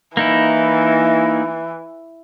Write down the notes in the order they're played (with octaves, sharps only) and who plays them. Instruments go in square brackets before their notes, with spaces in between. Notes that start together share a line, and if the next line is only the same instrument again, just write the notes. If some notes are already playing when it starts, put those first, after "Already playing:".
[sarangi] E3 [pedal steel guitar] A#3 D#4 E4